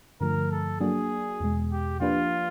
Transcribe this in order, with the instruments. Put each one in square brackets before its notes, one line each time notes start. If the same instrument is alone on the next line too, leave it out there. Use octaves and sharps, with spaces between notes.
[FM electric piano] G2 D3 F3 A3 [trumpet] A#4
[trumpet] A4
[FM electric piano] F#3 A#3 D4 F#4 [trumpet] G#4
[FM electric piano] E2 B2 G#3
[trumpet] G4
[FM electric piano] F3 A#3 D4 G4 B4 [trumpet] F4